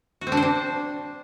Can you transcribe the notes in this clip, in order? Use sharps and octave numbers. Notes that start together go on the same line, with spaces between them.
F#4
C4
D4
C5
D4